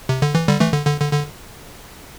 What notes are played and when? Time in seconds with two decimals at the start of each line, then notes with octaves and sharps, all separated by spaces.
0.09 C3
0.22 D3
0.35 E3
0.48 D3 G3
0.60 E3 A3
0.73 D3
0.87 D3
1.00 D3
1.13 D3